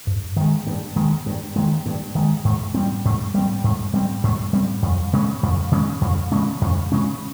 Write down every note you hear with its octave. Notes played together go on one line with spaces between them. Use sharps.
G2
D#3 G#3
G2
D#3 G#3
G2
D#3 G#3
G2
D#3 G#3
G#2
G3 C4
G#2
G3 C4
G#2
G3 C4
G#2
G3 C4
F2
C#3 G#3 C#4
F2
C#3 G#3 C#4
F2
C#3 G#3 C#4
F2
C#3 G#3 C#4